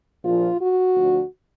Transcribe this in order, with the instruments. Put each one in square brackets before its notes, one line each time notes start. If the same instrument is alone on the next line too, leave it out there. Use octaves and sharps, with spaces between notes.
[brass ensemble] A#1 A#2 F3 F4
F#4
D2 D3 F3